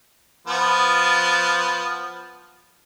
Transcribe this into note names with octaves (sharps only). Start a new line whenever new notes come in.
F3 B3